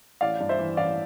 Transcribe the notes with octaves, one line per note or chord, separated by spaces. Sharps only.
A1 D5 F5
G2
C5 E5
E3
A1 D5 F5